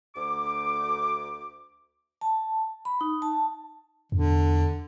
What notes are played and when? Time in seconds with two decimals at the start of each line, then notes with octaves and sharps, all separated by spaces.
0.16 D2 D6
2.21 A5
2.85 B5
3.01 D#4
3.22 A5
4.12 E2 D3